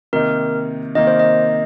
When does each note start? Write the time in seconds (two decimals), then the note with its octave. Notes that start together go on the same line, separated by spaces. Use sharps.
0.13 C3 D#3 A#3 D#4 A#4
0.95 C3 D#3 A#3 D#4 D#5
1.07 C5
1.19 D#5